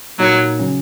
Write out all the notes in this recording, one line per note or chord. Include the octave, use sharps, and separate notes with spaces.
A#2 F#3 A#3 D#4
C#3 F#3 C#4